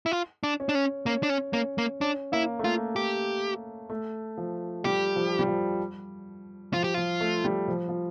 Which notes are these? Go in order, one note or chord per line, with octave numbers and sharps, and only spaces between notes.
E4
F4
D4
C#4
D4
C#4
A#3 C#4
D4
C#4
A#3 C#4
A#3
C#4 D4
A#3 E4
A3
A#3 F4
A3 G4
A3
F3
G3 G4
F3
G3
F3
F3 F4
G4
F3 F4
A3
G3
F3
F3